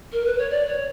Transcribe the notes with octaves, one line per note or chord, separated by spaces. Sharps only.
A#4
B4
C#5
D5
C#5